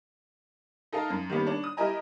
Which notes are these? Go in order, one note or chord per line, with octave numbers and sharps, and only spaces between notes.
D#4 A4 A#4 F5
F#2
D#3 G3 A#3 B3 C#4
D4 C#5
D#6
E4 G4 A#4 D#5 G#5 A#5